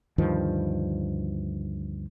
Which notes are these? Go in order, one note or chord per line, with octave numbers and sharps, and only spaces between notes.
D2 G2 D#3 F3